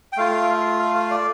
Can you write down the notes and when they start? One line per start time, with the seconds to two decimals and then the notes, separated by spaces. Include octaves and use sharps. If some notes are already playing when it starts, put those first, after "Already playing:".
0.13 G5
0.17 A3 F4 F5
0.79 F5
0.95 F5
1.11 D5